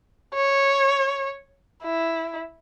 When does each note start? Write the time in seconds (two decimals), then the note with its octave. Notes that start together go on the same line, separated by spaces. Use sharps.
0.34 C#5
1.83 E4